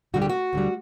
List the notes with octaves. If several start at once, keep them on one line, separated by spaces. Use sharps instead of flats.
D2 D3 G3 F#4
G4
F#4
D2 D3 G3